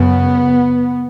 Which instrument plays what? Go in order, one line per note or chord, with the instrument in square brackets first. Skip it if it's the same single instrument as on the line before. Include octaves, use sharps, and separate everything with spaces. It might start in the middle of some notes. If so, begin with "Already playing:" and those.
Already playing: [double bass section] F#2 C#3 B3